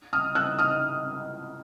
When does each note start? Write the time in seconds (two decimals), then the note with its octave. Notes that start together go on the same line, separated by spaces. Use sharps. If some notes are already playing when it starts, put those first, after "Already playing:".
0.13 D#6 F6
0.35 E6 F#6
0.58 D#6 F6